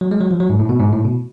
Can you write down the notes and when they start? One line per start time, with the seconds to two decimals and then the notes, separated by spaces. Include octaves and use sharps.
0.01 F#3
0.11 G#3
0.20 F#3
0.31 F3
0.40 F#3
0.50 G#2
0.59 A2
0.69 B2
0.79 G#2
0.92 A2
1.05 B2